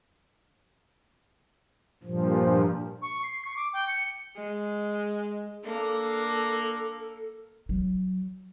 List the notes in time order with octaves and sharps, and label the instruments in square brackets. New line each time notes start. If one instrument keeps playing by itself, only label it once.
[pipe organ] G2 A#2 F3
[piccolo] C#6
C7
C#6
D6
G5
C#7
[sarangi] G#3
[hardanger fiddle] A#3 [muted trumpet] D4 [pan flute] A4
[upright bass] F#3